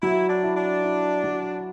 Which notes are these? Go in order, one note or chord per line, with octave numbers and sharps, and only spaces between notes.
F#3 E4
D4
E4
D4
E4
F#3